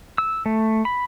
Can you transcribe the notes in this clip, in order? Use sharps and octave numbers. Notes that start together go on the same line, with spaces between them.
E6
A3
B5